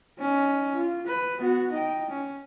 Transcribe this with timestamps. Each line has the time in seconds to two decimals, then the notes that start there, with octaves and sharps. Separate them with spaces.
0.19 C#4 D#4
0.75 F4
1.07 B4
1.37 B3 F#4
1.72 D#4 G5
2.10 C#4